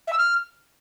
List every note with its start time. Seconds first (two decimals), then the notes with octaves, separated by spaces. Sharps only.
0.07 E5
0.12 E6
0.17 F6